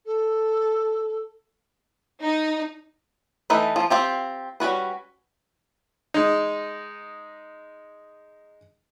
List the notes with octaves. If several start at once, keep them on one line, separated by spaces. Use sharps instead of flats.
A4
D#4
E3 A3 D#4 A4 B4
F3 F4
C4 F4 G4
G3 C#4 F#4 B4
G#3 D#4